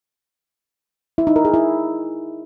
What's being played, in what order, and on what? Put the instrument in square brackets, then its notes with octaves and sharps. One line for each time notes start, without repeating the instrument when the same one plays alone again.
[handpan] E4
D#4
A#4
G#4
E4